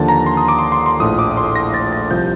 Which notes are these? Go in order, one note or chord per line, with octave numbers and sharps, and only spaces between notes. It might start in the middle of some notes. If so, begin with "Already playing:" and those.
Already playing: D#2 D3 F3 A5
A#5
C6
D#6
D6
C6
C6
C6
A#1 A2 F3 D#6
D6
C6
A#6
A6
A6
C2 C3 F3 G6